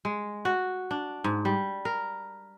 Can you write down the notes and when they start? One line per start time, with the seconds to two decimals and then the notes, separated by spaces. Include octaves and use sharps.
0.05 G#3
0.45 F#4
0.91 D4
1.24 G#2
1.45 G3
1.85 A#4